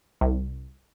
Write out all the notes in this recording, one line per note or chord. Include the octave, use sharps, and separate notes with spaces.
C2